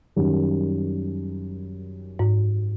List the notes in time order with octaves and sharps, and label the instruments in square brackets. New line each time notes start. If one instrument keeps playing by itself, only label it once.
[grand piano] F#2 D#3 G3
[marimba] G#2